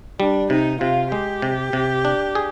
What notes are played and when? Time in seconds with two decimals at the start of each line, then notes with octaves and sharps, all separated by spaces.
0.20 G3 D4
0.50 C3 D#4
0.81 C3 F4
1.12 G#3 G4
1.42 C3
1.73 C3
2.05 D4
2.35 G#4